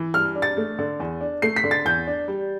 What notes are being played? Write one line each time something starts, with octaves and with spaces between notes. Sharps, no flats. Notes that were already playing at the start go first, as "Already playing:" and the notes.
Already playing: E3
G2 F6
D4
A6
A3
D3
E2
D4
A3 C7
B6
D3
A6
E2 G6
D4
G3